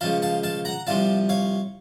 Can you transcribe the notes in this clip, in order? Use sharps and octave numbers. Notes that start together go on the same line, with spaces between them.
C#2 C#3 F3 F5 A5
F5 A5
F5 A5
F#5 A#5
C2 C3 F3 F5 A5
C#5 F5